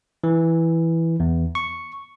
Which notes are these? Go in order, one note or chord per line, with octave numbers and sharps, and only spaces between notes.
E3
E2
C#6